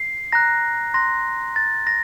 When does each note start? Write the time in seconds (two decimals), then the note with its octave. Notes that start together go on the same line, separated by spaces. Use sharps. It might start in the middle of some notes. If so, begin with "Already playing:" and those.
Already playing: C7
0.32 A#5 F#6 A#6
0.94 C6 F#6 A#6
1.56 C6 F#6 A6
1.87 A#6